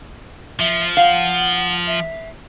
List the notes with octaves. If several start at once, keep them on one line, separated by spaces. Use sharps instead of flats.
F3 E5
F5 F#5
E5